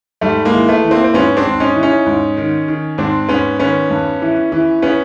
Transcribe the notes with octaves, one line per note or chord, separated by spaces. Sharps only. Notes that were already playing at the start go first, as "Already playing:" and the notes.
G#2 G3 A3
G#3 A#3
E3
A3 B3
E3
A#3 C4
C4
G#2 B3 C#4
C4 D4
G#2
C#4 D#4
E3
C#4 D#4
G#2
D#3
D#3
G#2 C4 D4
G#2 B3 C#4
D#3 B3 C#4
G2
E3
E3
B3 C#4